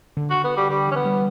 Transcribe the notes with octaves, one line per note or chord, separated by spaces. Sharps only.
D3
F#4
B3
G3
D3 G3
E3
C#4
B3
G3